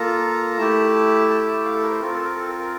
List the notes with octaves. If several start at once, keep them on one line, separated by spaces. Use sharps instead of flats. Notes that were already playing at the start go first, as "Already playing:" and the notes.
Already playing: A#3 F4 A4 A#5
A3 E4 G4 A5
A5
F5
A4
A#4
C5
C4 F4 A4 A#4
A4
A#4
A4
A#4
A#4